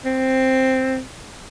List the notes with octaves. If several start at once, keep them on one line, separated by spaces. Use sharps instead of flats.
C4